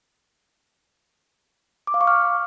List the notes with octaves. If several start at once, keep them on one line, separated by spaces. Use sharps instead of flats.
D6
F5
C#6
F6